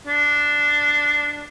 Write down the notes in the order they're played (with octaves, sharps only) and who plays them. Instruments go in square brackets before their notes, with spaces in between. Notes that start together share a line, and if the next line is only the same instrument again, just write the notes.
[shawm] D4